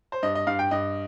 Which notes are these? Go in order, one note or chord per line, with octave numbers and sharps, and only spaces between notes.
C5
G2 D#5
D#5
G2 F5
G5
G2 D#5